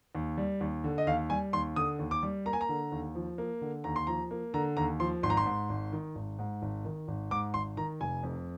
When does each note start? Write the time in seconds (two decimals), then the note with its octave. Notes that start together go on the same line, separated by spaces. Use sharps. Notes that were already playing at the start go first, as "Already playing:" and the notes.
0.15 D#2
0.38 G3
0.61 D#2
0.84 D3
0.98 D#5
1.07 D#2 F5
1.30 G3 G#5
1.53 D#2 C6
1.76 D3 D#6
1.99 D#2
2.11 D6
2.23 G3
2.46 A#3 A#5
2.53 G#5
2.61 A#5
2.69 D3
2.92 D#2
3.15 F3
3.38 A#3
3.61 D3
3.84 D#2 A#5
3.96 C6
4.07 F3 A#5
4.31 A#3
4.54 D3 A#5
4.77 D#2 A#5
5.00 F3 C6
5.23 G#1 C6
5.30 A#5
5.37 C6
5.46 G#2
5.69 G#1
5.92 D#3
6.15 G#1
6.39 G#2
6.62 G#1
6.85 D#3
7.08 G#1
7.31 G#2 D6
7.54 G#1 C6
7.77 D#3 A#5
8.00 F1 G#5
8.23 F2